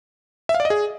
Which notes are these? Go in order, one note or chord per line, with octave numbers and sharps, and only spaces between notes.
E5
F5
D5
D#5
G#4